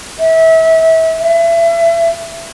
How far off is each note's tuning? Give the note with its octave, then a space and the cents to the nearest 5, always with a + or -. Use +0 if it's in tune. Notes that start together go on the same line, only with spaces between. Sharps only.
E5 -30
E5 +30